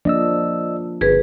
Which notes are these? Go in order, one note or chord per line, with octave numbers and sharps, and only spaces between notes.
F3 A#3 D4 D5 D#5 E6
G1 G#4 B4